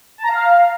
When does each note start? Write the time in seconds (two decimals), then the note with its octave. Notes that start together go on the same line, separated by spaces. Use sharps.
0.18 A5
0.23 A#5
0.29 F5